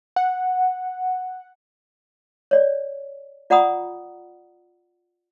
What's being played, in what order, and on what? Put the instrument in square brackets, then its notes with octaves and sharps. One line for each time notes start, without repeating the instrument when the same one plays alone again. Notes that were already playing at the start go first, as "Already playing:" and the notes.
[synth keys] F#5
[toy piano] C#5 D5
F4 D5 F#5 A#5 B5 D#6